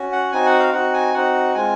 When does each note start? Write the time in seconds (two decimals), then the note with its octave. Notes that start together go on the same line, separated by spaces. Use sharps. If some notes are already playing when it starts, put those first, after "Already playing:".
Already playing: C#4 F#4
0.12 F#5
0.32 C4 D#4 F#4 G#5
0.46 F#5
0.60 F5
0.73 C4 D#4 F#4 F#5
0.93 G#5
1.14 C4 D#4 F#4 F#5
1.54 G#3 C4 F4 G#5